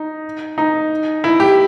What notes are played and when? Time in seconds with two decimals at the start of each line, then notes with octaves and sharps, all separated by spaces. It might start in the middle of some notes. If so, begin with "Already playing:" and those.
Already playing: D#4
0.58 D#4
1.24 E4
1.40 G4